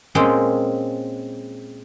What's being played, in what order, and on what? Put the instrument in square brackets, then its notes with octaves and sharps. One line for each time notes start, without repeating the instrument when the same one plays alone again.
[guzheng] A#2 G#3 C4 C#4 G5